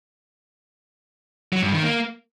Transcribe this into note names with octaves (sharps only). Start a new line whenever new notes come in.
F#3
G2
D#3
A#3